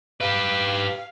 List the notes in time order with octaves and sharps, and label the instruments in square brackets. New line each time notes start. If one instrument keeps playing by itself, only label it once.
[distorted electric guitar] G4 B4 [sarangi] F5